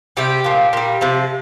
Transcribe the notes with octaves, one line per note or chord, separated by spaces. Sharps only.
C3 G3 G4
A#2 F3
A#2 G3
C3 F3